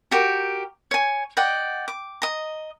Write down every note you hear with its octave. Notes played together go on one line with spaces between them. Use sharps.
F#4 G4 A#4
C#5 G#5
D5 D#5 F#5 G5
D6
D#5 A#5